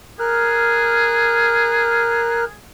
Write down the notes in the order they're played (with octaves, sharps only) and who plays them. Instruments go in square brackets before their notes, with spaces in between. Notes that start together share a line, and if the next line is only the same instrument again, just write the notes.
[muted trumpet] G#4 [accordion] A#4 F6 F#6